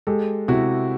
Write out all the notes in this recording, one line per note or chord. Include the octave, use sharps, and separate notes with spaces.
G#3 G4 A4
C3 E4 F#4